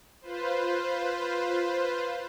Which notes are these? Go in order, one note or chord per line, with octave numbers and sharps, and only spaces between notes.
F4 B4 C5